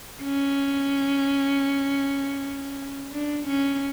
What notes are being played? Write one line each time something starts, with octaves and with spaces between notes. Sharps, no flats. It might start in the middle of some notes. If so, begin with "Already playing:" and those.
C#4
D4
C#4